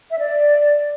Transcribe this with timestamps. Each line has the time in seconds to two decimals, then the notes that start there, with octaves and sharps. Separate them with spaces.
0.11 E5
0.19 D5